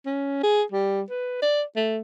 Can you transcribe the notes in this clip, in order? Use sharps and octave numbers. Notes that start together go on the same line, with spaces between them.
C#4
G#4
G3
B4
D5
A3